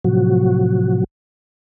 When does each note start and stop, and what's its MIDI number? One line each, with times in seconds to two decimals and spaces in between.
0.05 1.04 45
0.05 1.04 48
0.05 1.04 53
0.05 1.04 54
0.05 1.04 66